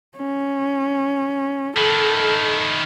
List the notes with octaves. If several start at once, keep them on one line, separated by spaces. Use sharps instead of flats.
C#4
D#3 E4 A4